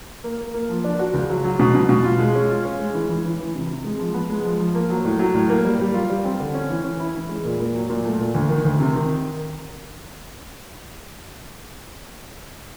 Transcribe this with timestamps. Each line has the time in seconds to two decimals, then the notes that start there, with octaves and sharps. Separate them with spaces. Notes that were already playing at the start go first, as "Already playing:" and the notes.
0.24 A#3
0.39 A#3
0.54 A#3
0.69 F3
0.84 D4
0.99 F#4
1.14 C#2
1.30 F#3
1.44 F#3
1.59 B2
1.75 B2
1.89 B2
2.04 F4
2.19 G#3
2.35 C#4
2.49 F4
2.65 C#4
2.79 G#3
2.95 E3
3.09 E3
3.24 E3
3.40 E3
3.55 C3
3.69 C3
3.84 G#3
3.99 F3
4.14 B3
4.30 G#3
4.45 F3
4.60 F3
4.75 A#3
4.90 F#3
5.05 A2
5.19 F#3
5.34 A2
5.49 A#3
5.65 G3
5.80 G3
5.94 F4
6.09 G3
6.25 C4
6.40 D3
6.54 C#4
6.70 E3
6.84 C#4
7.00 E4
7.15 E3
7.29 G#3
7.45 A#2
7.60 A#2
7.75 F#3
7.90 A#2
8.05 A3
8.19 A#2
8.35 D2
8.49 D#3
8.65 D2
8.80 C3
8.95 D#3